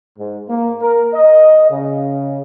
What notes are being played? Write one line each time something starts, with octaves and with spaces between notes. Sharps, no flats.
G#2
A#3
A#4
D#5
C#3